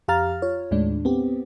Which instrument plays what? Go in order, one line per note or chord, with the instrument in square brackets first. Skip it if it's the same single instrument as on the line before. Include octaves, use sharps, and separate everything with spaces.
[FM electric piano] F2 G4 F5 A#5 F6 A6
F4 C#5
D#2 A2 D#3 G#3 D4
B3 C4 G4